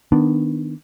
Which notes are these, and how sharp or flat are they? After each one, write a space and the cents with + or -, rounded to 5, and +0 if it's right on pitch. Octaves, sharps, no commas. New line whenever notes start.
D#3 +5 B3 +0 D4 +15